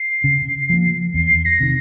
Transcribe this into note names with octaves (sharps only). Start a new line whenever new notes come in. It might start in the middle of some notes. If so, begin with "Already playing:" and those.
Already playing: C7
C#3
F3 A#3
E2 C7
A#6
C3 D#3